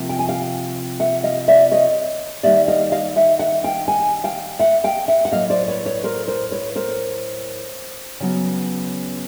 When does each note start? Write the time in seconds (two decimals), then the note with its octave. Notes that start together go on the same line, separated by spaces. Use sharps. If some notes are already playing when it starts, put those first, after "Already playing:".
Already playing: C3 F3 A#3
0.09 G5
0.19 G#5
0.29 F5 G5
1.00 E5 F#5
1.24 D#5 F5
1.48 D5 E5
1.72 C#5 D#5
2.43 D#3 G3 A#3 D5 E5
2.68 D#5 F5
2.92 D#5 F5
3.16 E5 F#5
3.39 E5 F#5
3.64 F5 G5
3.88 F#5 G#5
4.24 F5 G5
4.59 E5 F#5
4.84 F5 G5
5.08 E5 F#5
5.25 F#5
5.31 A2 F#3 A#3 D#5 F5
5.50 C5 D5
5.68 B4 C#5
5.85 B4 C#5
6.04 A#4 C5
6.28 A#4 C5
6.51 B4 C#5
6.76 A#4 C5
8.20 C#3 F#3 B3